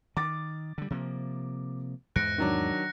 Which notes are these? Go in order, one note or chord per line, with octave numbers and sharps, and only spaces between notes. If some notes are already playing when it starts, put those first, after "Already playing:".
D#3 D6 A6
D3 G3
C3 F3 A#3
E2 G#2 F#6 A#6 C#7 D7
D#3 F#3 D4